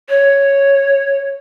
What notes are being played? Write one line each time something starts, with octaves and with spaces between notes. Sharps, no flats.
C#5